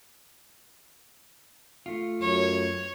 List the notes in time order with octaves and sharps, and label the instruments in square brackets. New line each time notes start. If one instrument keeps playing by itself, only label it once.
[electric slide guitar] A3 F4
[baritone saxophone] F#2 [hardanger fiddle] C#5